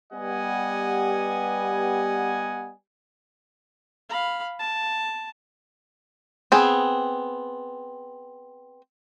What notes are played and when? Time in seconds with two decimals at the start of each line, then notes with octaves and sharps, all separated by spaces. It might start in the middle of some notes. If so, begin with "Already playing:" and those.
0.13 G3 B3 G4 D#5 F#5 G#5
4.10 F5 B5
4.60 A5
6.52 B3 C4 G#4